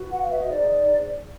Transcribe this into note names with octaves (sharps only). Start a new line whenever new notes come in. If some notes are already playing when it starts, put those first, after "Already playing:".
Already playing: F#4 B4
F#5
F5
E5
D#5
D#4 G#4 C5 D5